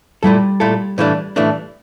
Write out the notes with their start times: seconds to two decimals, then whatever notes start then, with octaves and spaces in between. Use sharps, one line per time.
0.23 A#2 G3 A3 E4 A4
0.60 A#2 A3 E4 A4
0.98 A2 E3 A3 D4
1.36 A2 E3 A3 D4